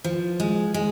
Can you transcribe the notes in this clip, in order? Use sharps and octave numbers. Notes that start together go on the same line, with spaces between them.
F3
G#3
G#3